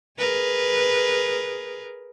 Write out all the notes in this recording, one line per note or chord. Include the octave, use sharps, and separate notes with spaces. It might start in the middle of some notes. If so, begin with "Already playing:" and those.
G#4 A#4 B4